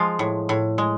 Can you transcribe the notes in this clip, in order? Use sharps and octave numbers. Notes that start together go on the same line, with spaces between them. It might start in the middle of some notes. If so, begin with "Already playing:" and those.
Already playing: F3 G#3 F4
A2
A2
G#3